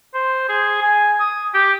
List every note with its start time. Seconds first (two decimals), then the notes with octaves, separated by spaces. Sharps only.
0.14 C5
0.49 G#4
0.82 G#5
1.20 D#6
1.54 G4